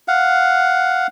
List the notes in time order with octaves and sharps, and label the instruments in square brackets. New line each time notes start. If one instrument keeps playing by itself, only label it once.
[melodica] F5 F#5